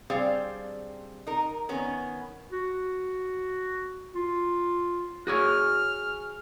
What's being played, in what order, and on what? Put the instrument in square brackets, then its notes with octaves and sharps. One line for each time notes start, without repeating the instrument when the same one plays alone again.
[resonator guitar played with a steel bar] G3 C4 D4 G#4 C5 F5
D#4 A#4
D#3 B3 C#4
[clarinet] F#4
F4
[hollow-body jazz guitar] F#4 G#4 C#5 [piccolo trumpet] F6